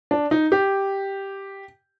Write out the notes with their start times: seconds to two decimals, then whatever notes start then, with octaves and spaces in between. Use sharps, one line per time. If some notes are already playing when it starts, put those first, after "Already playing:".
0.11 D4
0.31 D#4
0.52 G4